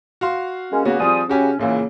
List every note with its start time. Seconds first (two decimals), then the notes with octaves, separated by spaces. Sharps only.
0.21 F#4 F5 C6
0.72 G#3 A#3 C#4
0.85 C#3 A#3 B3 F#4
1.00 F3 G3 C4 F4 G#4 D#6
1.29 C#3 C#4 F#4 G4 G#5
1.59 A#1 A#2 C#3 E3 A#3